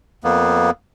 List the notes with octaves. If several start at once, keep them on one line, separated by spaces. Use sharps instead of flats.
F2 A#3 B3